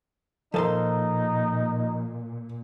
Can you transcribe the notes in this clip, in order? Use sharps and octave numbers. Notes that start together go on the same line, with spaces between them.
A#2 F3 D#4 A4 A#4 A5 A#5 C6